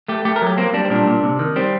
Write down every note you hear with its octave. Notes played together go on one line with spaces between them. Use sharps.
A3 G4
A3 G4
A#4
F#3 G4
A#3 C4
G3 D4
C4
A#2 D4
A#2
C3
D#3
G3 C4